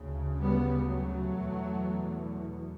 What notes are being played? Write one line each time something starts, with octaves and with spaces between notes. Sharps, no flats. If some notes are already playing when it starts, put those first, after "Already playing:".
Already playing: D2 C#3
G3 B3
F#3 A3
E2 B2